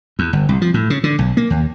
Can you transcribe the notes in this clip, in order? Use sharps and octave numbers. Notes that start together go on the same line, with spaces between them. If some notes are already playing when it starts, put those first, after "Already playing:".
E2
G1
C2
F3
A2
C#3
D3
B1
A#3
D#2